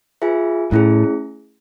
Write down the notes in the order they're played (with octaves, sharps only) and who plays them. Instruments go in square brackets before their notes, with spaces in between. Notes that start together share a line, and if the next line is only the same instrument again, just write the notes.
[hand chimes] F4 G#4 B4 E5 G#5
[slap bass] A2 [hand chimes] A3 C#4 E4 G#4